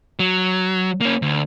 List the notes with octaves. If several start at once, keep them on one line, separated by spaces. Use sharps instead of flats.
F#3
A#3 C#4
D2